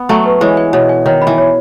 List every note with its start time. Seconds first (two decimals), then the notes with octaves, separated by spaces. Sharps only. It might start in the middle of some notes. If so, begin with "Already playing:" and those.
Already playing: B3
0.09 F#3 A3 G#5
0.26 B4
0.41 E3 G#3 C#5
0.57 G#5
0.73 B2 C#5
0.89 G#5
1.06 D#3 C#5
1.22 B5
1.27 E3
1.38 C#5